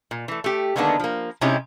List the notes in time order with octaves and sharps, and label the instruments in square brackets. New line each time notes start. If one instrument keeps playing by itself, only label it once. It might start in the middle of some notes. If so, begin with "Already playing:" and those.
[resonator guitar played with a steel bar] A#2
E3 A3
A3 G4
D3 D#3 G#3 A#3 B3 D4
F3 A#3
C3 G#3 C#4 D#4 E4 G4